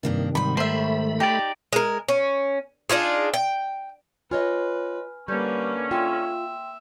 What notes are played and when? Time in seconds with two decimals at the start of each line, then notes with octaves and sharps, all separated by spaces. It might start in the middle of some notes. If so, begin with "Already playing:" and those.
0.03 G2 C3 D#3 A#3 D4
0.35 G#2 G3 B5
0.57 D#3 A3 C5 E5 B5
1.20 D#4 G4 D5
1.73 G#3 A#4
2.08 C#4
2.90 D4 D#4 F4 G#4
3.34 G5
4.31 F4 B4 C#5 D#5 G#5 F6
5.28 D3 G3 A#3 C#4 B4 G6
5.91 F4 E5 G5 C6